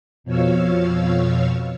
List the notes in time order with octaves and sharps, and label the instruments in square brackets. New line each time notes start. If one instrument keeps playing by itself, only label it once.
[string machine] F2 B2 F3 C#5 F5 E6